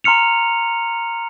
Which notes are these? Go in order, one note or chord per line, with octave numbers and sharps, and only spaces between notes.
A#5 C6 F6 C#7 F7